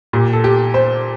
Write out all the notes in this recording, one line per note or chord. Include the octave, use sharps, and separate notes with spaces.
A#2 G4
A4
G4
C5